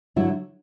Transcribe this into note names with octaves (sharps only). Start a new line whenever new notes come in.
D3 F#3 E4